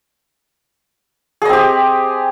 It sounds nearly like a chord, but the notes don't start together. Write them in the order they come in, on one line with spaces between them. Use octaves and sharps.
G#4 D#5 C4 G4